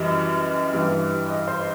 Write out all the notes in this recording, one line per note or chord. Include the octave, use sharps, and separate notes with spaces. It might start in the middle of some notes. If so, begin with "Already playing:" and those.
Already playing: F#2 E3 G3 D#5
G2 E3 G3
D#5
C5